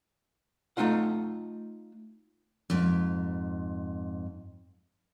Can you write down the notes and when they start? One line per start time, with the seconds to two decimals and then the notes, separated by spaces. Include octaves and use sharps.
0.77 A3 C#4 D#4 F4 F#5
2.70 F2 G#2